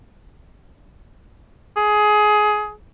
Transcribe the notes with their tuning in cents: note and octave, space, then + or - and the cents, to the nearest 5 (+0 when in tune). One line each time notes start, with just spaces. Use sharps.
G#4 +20